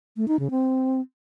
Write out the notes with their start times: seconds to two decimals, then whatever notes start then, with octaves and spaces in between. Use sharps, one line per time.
0.17 A3
0.28 D#4
0.39 C#3
0.51 C4